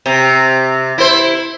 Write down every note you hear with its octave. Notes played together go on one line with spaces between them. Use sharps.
C3
E4 C5